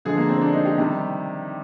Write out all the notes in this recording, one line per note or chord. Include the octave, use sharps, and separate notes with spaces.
D3 F3 G#3 G#4
A#3
C4
D4
D#4
G4
C3 D#3 G3